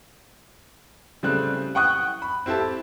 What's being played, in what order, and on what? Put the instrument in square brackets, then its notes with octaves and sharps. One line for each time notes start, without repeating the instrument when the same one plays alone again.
[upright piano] C#3 G3 A3 C4 F#6
F#5 G5 C#6 D#6 F#6
B5
C4 E4 G4 A4 A5